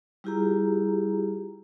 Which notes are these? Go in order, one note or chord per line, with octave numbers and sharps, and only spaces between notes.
G3 E4 F4 G4 G#4 A#5